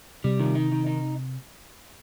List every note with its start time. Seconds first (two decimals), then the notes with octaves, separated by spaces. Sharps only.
0.24 C3 G3
0.40 D#3
0.55 D#4
0.72 D#3
0.86 D#4